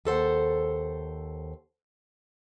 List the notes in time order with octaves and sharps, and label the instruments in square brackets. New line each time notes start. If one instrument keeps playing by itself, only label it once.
[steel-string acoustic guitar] D#2 A4 C5 F#5